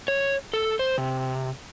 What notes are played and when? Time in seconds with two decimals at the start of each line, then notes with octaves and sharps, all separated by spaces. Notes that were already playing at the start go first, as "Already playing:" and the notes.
0.08 C#5
0.53 A4
0.79 C5
0.98 C3